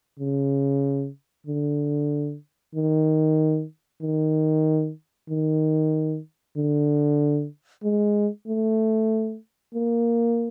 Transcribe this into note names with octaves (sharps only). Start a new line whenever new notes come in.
C#3
D3
D#3
D#3
D#3
D3
G#3
A3
A#3